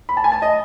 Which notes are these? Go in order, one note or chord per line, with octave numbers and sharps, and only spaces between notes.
B5
A5
G#5
A5
D#5